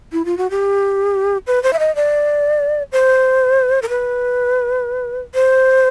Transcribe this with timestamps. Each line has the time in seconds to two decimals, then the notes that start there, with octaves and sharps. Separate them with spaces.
0.12 E4
0.25 F4
0.37 F#4
0.50 G4
1.47 B4
1.63 C5
1.73 E5
1.79 D#5
1.95 D5
2.92 C5
3.82 A#4
3.89 B4
5.35 C5